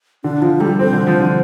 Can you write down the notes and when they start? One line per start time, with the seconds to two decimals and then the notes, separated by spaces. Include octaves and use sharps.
0.24 D3 D4
0.42 F3 F4
0.60 G3 A4
0.79 C4 C5
0.93 D3
1.07 F3
1.21 D3